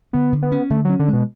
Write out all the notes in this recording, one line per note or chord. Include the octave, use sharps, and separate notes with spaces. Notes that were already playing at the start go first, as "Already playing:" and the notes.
D3 B3
D3
B3
C#4
D3 A3
F#3 C#4
D3
B2 G#3